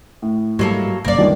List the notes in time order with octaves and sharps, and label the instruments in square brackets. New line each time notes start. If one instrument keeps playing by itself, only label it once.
[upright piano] A2
[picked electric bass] G#2 G3 [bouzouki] F#3 A#3 A4
[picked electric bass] G1 C2 F#2 [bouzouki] A#3 D5
[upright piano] G1 C#2 D#3 [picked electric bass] G#3 D4